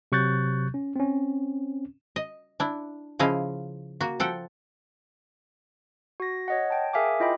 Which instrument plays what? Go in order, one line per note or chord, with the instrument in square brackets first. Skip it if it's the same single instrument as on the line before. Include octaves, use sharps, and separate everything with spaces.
[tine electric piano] C3 F#3 C#6 F#6 G6 A6
C#4
C4 C#4
[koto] D#5
D4 E4
C#3 F3 E4 D#5 F5
A#3 F#4
F3 A4 F#5 G5
[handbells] F#4 A#6
C#5 D#5 F#5
G5 A5
G#4 A#4 E5 F5 G#5 D6
E4 F4 D#5 G5 B5 D6